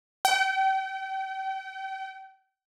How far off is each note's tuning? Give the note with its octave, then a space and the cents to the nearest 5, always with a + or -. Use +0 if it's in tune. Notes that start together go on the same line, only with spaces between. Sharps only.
G5 -35